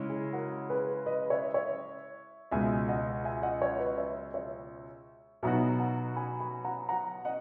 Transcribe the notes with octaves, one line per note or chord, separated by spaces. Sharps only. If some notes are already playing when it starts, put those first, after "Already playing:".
Already playing: C#3 G#3 C#4 E4
G#4
F#4 A#4
G#4 B4
B4 D#5
C#5 E5
C#5 E5
C#2 B2 G#3 E5 G#5
D#5 F#5
E5 G#5
D#5 F#5
C#5 E5
B4 D#5
C#5 E5
C#5 E5
B2 F#3 B3 D#4 F#4 E5 G#5
B5
F#5 A#5
G#5 B5
G#5 B5
F#5 A#5
F#5 A#5
D#5 F#5